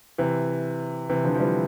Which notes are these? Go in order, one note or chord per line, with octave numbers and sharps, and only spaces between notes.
C3 E3
C3 E3
D3 F3
F3
E3 G3